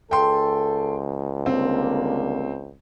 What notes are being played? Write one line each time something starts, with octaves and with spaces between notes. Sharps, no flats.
C#2 A4 G5 C6
D3 G3 A#3 C4